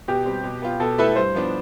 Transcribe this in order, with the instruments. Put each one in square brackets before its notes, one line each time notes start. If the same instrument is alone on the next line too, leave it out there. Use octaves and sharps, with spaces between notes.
[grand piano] B2 [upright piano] G4
[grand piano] G3 C4
B2
B3 F4
[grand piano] B2 [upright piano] A4
[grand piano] A3 E4 A4 E5 [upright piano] B4
[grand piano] G2 [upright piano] C5
[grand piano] F3 B3 D4